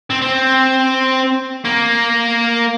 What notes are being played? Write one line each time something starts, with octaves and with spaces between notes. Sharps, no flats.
C4
C4
A#3